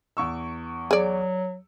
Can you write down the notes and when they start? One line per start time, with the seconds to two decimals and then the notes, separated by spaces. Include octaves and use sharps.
0.17 E2 C#6 E6
0.91 F#3 G#4 D5